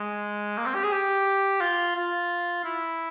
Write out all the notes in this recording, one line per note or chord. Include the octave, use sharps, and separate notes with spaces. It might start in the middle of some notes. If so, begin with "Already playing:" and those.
Already playing: G#3
A#3
C4
G4
G#4
G4
F4
F4
E4